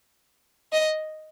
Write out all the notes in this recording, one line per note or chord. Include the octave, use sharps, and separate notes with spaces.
D#5